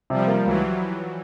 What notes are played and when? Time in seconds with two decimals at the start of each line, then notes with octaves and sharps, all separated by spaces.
0.10 C3 F3 G3
0.28 A#3
0.45 C#2 E3 F#3